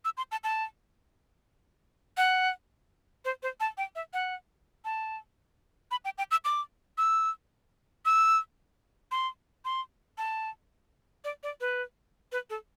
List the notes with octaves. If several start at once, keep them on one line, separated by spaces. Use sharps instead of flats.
E6
C6
A5
A5
F#5
C5
C5
A5
G5
E5
F#5
A5
B5
G5
G5
E6
D6
E6
E6
C6
C6
A5
D5
D5
B4
B4
A4